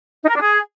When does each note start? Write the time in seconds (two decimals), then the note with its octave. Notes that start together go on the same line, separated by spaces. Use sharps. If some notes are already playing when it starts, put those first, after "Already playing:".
0.22 D#4
0.29 A#4
0.35 D4
0.41 G#4